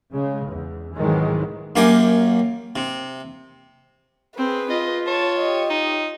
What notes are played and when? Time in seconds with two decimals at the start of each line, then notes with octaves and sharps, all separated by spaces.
0.11 C#3 G#3
0.48 E2
0.97 C2 G#2 D#3 E3 F#3 G#3
1.76 F#2 A#3 G4 G#5
2.76 C3
4.38 C4 G#4 B4
4.70 F4 D#5
5.07 C#5 A5
5.40 G4 D#5
5.70 D#4